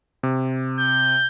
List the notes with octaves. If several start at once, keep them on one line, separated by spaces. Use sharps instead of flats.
C3
G6